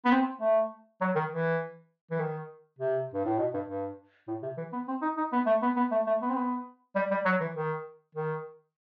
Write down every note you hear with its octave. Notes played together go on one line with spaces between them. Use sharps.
B3
C4
A3
F#3
D#3
E3
E3
D#3
C3
G2
A2
B2
G2
G2
A2
C3
E3
B3
C4
D#4
D#4
B3
A3
B3
B3
A3
A3
B3
C4
B3
G3
G3
F#3
E3
D#3
D#3